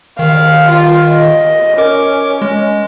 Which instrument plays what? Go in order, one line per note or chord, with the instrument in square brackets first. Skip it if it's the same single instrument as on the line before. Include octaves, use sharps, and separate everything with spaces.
[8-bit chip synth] D#3 [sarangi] F5
[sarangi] F4
D#5
[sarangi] C#4 [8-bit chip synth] A#4 D6
[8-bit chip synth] G#3